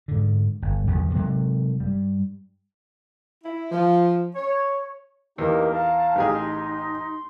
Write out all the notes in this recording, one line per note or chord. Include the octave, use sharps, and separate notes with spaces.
G#2 D3
G1
B1 E2 D3 F3
C3 F#3 G#3
G2 G3
E4
F3
C#5
E2 A#3 D#4 G4 A#4
F5 A5 A#5
A1 D#4 G4 G#4
C6